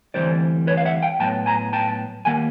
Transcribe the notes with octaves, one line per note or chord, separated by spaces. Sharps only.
D2 C3 E3 G3 C4 C5 D5
B4 C#5
F5
E5 F#5
F5 G5
A2 F#3 B3 G5 A5
G#5 A#5
G5 A5
D#2 D#3 G3 A#3 F#5 G#5